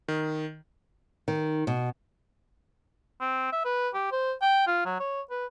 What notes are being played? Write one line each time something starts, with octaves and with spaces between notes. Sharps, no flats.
D#3
D#3
B2
C4
E5
B4
G4
C5
G5
F4
F#3
C#5
B4